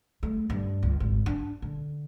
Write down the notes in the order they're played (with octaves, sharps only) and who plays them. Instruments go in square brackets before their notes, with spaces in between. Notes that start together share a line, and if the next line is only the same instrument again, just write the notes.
[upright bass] A3
G2
C#2
G#1
D4
D3